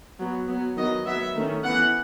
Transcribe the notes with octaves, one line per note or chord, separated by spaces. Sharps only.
F#3 B3
F#3 B3
D#3 F#3 B3 D#5
F#3 B3 E5
D#3 A3 C#4
E3 B3 F#5